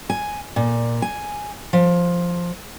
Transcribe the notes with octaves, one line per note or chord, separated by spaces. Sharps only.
G#5
A#2
G#5
F3